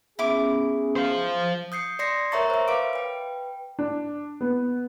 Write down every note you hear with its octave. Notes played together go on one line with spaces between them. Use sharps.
B3 C#4 E4 G#4 D6
C5 F5
D#6 G6 C7 C#7
D5 C6 A#6 C7 C#7
A#4 C#5 E5 A#5 C#6 A6
C5 E5
B4 F5 D6 D7
B4 G5
D4
B3